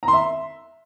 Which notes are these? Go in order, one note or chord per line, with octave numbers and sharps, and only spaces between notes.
A#5
C6
E5